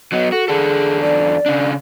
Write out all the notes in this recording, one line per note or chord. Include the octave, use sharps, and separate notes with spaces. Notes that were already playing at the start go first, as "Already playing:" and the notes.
F#3 B3 D#5
F#4 A4
E2 D4 G#4 A4
D5
C#3 D4